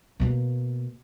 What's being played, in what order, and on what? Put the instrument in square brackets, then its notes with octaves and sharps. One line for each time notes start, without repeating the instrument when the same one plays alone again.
[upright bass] B2 A#3